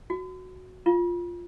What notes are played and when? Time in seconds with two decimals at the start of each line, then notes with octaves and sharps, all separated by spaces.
0.10 F#4
0.86 F4